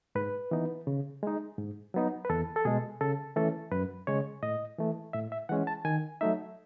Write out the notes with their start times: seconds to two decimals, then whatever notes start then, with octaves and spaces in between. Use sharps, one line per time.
0.15 G#2 B4
0.51 E3 B3 D#4
0.87 C#3
1.23 G#3 D#4
1.57 G#2
1.94 F#3 B3 D#4
2.25 B4
2.30 E2 A4
2.56 A4
2.65 B2 G#3 G#4
3.01 C#3 A4
3.36 E3 A3 C#4 A4
3.71 F#2 B4
4.07 C#3 G#3 C#5
4.43 A2 D#5
4.78 E3 A3
5.13 A2 E5
5.32 E5
5.49 E3 G#3 C#4 F#5
5.67 A5
5.85 D#3 G#5
6.21 F#3 A3 D#4 E5